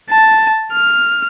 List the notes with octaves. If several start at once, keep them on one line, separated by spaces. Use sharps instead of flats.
A5
F6